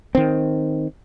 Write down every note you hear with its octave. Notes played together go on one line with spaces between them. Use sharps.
D#3 C4